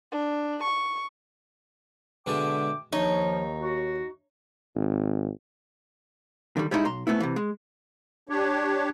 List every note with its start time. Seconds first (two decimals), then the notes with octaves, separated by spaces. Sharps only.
0.12 D4
0.63 C#6
2.26 B2 D3 G#3 E5 G5 A5 D6
2.93 D#2 F3 D#4 C#5
3.61 F#4
4.76 G#1
6.57 D3 D#3 G3
6.71 G3 G#3 B3 D#4 E4 D#5
6.85 B1 A#5 C6
7.07 G#2 A3 B3 C#4 E4
7.20 C3 E3
7.36 G#3
8.29 D4 G4 C#5